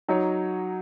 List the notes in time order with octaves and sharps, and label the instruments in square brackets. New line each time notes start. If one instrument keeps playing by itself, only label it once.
[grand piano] F#3 D#4 F#4 C#5